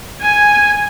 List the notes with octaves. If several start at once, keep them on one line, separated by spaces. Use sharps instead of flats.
G#5